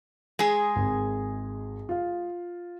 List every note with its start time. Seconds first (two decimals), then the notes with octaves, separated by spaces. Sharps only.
0.39 G#3 G#4
0.76 G#1
1.89 F4 F5